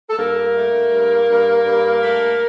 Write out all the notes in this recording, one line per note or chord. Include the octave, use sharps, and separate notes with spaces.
A4
G2 A#3 A#4
A3
G2
G2
G2
A3